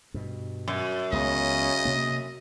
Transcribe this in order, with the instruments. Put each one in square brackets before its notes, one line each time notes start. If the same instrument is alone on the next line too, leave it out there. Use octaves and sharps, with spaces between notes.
[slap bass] G2 B2
[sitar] F#2
[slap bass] C#2 B3 [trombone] C#3 [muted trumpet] D#5
[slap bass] C3 A#3